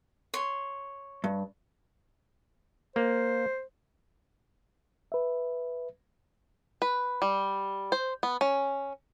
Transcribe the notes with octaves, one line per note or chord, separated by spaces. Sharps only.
C#5 C6
G2
A#3 C5
B4 E5
B4
G3
C5
B3
C#4